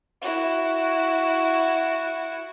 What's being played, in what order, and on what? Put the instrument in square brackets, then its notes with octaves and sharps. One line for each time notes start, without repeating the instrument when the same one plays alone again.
[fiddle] E4 F#4